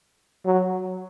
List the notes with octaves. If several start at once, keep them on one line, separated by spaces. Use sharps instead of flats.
F#3